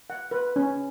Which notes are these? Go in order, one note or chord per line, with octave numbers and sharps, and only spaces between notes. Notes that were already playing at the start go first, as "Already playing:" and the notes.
F#5
B4
C#4